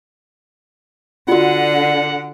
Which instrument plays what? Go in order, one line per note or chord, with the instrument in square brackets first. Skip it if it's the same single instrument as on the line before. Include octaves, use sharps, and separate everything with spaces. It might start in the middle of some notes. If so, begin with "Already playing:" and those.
[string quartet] D3 [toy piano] F4 F#4 [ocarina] D5 [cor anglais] F#5